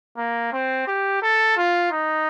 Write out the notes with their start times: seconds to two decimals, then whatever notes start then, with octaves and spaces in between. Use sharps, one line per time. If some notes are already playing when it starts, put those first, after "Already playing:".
0.17 A#3
0.52 C4
0.87 G4
1.22 A4
1.57 F4
1.92 D#4